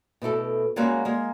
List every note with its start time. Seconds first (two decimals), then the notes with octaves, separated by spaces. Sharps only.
0.22 B2 A3 E4 A4
0.76 G3 G#3 A#3 C#4 F#4 F5
1.05 G#3 A#3